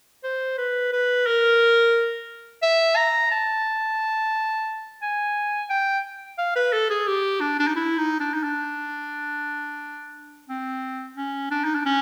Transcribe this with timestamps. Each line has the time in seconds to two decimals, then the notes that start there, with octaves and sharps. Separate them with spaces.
0.24 C5
0.58 B4
0.93 B4
1.26 A#4
2.63 E5
2.96 A#5
3.31 A5
5.02 G#5
5.70 G5
6.38 F5
6.56 B4
6.73 A4
6.90 G#4
7.07 G4
7.41 D4
7.59 D4
7.67 D#4
7.76 E4
7.97 D#4
8.20 D4
8.34 D#4
8.43 D4
10.48 C4
11.17 C#4
11.51 D4
11.64 D#4
11.75 D4
11.85 C#4